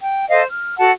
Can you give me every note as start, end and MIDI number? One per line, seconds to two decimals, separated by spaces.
0.01 0.29 79
0.29 0.43 69
0.29 0.43 72
0.29 0.43 75
0.29 0.43 77
0.50 0.76 89
0.78 0.91 66
0.78 0.91 69
0.78 0.91 78
0.78 0.91 81